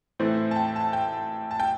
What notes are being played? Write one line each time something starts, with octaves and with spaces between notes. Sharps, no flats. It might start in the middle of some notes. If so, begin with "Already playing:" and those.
A2 E3 A3 C4 C5
A5
G5
A5
G5
A5
G5